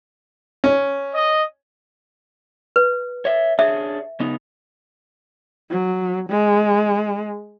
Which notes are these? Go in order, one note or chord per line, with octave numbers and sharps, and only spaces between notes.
C#4
D#5
B4
C#5 E5
D4 G#4 C#5 E5
C#3 B3 D#4
F#3
G#3